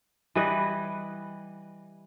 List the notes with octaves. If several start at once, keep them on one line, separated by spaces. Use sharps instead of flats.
E3 G3 B4 D#5